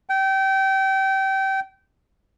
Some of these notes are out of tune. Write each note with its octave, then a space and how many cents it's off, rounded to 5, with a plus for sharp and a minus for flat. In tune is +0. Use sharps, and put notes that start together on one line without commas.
G5 -25